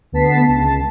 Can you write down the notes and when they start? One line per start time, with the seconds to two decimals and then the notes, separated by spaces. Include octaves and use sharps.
0.12 D2 B3 A5 B6 C7
0.48 C#2 A5